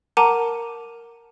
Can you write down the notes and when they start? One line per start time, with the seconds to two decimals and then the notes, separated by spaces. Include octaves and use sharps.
0.17 A#4 F#5 A5 A#5 D6 D#7